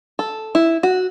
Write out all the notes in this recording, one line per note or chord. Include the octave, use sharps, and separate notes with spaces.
A4
E4
F#4